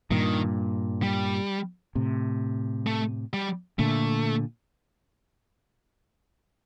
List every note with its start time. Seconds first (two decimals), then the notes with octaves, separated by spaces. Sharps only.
0.11 G2 A#2 D#3
1.03 G3
1.95 A2 C3
2.87 A3
3.33 G3
3.79 A#2 D3 A3